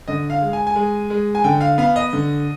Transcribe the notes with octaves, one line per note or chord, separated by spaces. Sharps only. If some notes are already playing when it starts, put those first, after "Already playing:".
D3 D#5
F5
G#3
G#5
G#5
G#3
G#3
G#5
D3 G5
F5
B3 F5
D#5
D3